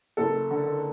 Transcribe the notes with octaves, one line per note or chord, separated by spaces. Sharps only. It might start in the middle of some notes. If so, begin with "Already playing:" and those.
F#1 A4
D3